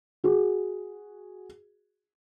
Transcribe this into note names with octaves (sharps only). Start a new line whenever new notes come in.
F#4 G#4